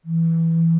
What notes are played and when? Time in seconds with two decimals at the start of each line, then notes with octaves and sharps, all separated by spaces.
0.05 E3